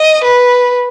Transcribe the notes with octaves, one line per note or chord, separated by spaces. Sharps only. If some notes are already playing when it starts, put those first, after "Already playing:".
Already playing: D#5
B4